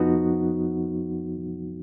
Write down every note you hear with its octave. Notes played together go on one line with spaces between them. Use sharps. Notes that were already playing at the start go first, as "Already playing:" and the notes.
Already playing: F2 F3 B3 D#4 F#4